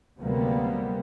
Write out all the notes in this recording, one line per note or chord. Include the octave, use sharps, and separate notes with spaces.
D2 C3 F#3 G3 A#3 B3